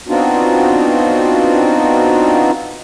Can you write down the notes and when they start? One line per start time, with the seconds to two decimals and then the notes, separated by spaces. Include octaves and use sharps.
0.08 B3 C4 D4 D#4 F4 F#4